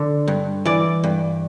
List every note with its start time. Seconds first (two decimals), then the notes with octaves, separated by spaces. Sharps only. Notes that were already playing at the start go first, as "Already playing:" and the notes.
Already playing: D3
0.28 G2
0.66 E3 D5
1.04 G2